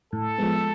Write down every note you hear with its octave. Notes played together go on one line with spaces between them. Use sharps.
A2 A4
F3 G#3 B3